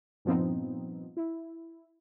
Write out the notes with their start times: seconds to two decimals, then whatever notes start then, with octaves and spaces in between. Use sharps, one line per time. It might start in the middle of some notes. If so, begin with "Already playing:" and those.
0.25 G2 A#2 F3 B3 C4 D#4
1.17 E4